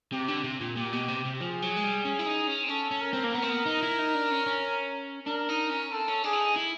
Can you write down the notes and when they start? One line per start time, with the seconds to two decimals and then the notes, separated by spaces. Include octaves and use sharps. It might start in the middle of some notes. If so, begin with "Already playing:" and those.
0.12 C3 G4
0.28 D3
0.44 C3
0.60 A#2
0.76 A#2 G4
0.93 B2
1.08 C3
1.25 C3
1.41 F3 G#4
1.62 F#3
1.76 G#3
1.84 G3
2.05 C#4
2.19 E4
2.26 D#4
2.48 C#4
2.64 C4
2.69 C#4 A4
2.91 C#4
3.01 A#4
3.13 C4
3.24 A#3
3.34 B3 A#4
3.42 C4
3.50 B3
3.66 D#4
3.83 E4
3.99 D#4
4.15 D4
4.31 C#4
4.46 C#4
5.27 D4 A#4
5.49 D#4
5.70 C#4
5.91 C4 A4
6.08 C#4
6.24 D4 G#4
6.33 E4
6.40 D#4
6.56 E4